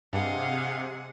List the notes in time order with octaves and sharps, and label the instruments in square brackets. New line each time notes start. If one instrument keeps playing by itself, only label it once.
[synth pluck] G2 [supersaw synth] C3 [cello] G#4 F#5 [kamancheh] D#5 F5